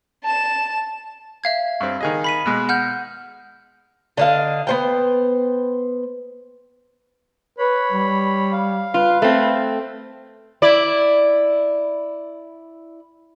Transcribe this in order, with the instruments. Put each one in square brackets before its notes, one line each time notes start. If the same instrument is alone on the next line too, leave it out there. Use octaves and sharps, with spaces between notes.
[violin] A5 E7
[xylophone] E5 F5 G#6
[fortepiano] G2 C4
D#3 G#4 D#5
[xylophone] B5 B6 D#7
[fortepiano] B2 G#3
[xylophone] F#5 F6 G6
[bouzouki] D3 D#5 F5
B3 C5 G5
[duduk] B4 [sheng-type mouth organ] C#5 B5
[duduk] G3
[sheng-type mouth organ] F5
[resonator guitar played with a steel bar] F4 [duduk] B4
[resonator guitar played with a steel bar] A3 C4
[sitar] E4 D5